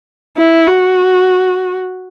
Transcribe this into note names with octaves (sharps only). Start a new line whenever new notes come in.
E4
F#4